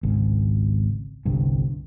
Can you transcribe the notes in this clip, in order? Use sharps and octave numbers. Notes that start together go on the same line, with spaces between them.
G#1 C#2
G1 C2 G2